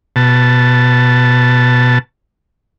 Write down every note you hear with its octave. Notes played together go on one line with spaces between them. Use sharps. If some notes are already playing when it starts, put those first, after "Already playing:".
B2 A5